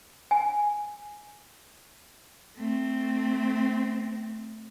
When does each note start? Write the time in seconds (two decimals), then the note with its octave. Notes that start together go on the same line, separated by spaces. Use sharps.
0.31 G#5
2.56 A3 C4